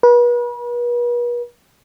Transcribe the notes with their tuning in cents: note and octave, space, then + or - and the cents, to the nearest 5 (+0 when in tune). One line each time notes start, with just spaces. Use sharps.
B4 -40